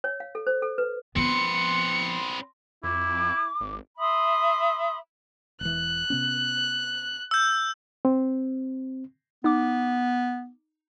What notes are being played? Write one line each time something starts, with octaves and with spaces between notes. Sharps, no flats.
C#5
F5
A4
C5
A4
B4
F3 B3 C4 B4 C6 C#7
F2 E4 D6
G#1
E5 B5 C6 D#6
E1 E3 F#6
C3 B3 C#4
E6 G6
C4
B3 D#4 D6